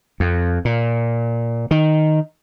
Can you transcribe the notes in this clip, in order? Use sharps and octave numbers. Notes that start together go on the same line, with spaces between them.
F2
A#2
D#3